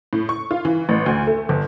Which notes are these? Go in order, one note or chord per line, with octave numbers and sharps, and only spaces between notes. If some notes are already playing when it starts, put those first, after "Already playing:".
A2
C#6
F4
E3
A1
D2
A3
G1